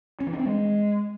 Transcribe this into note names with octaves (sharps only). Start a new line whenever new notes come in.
C#4
E3
D4
C4
G#3